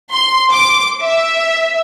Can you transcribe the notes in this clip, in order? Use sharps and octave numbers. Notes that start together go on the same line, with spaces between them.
C6
D6
E5